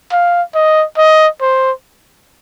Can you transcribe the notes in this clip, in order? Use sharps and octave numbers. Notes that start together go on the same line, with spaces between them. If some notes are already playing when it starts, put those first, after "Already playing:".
F5
D#5
D#5
C5